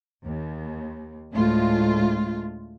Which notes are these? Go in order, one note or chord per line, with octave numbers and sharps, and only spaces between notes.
D#2
D2 A2 G#3 A3 F4